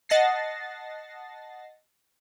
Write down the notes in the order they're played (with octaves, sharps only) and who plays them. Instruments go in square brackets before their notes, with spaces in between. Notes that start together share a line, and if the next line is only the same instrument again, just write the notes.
[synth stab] D#5 F#5 A5 A6 A#6 C7